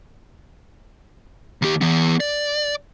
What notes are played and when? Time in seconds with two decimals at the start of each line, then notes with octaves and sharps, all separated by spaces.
1.62 D#2 G4
1.81 E3 B3
2.20 D5